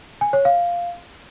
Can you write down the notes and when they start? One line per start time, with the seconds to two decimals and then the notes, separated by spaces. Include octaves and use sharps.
0.21 G#5
0.33 C#5
0.45 F5